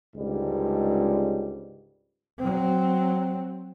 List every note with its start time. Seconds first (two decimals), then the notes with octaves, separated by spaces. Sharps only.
0.16 C#2 G#2 D3 G3
2.39 F#3 C4